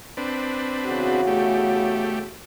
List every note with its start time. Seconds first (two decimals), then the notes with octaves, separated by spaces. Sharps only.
0.17 C4 D4 B4
0.86 E2 C#3 F#4
1.27 A3 G4